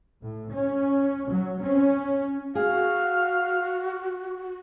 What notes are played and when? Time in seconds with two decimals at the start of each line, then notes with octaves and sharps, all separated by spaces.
0.22 A2
0.52 C#4
1.30 F#3
1.62 C#4
2.55 F#4 G#4 F5